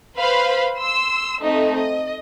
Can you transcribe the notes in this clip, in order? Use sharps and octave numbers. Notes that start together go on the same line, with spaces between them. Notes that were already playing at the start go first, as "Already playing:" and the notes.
B4 C5 F5 B5
C6 E6
A3 C4 D#4 D#5
D#5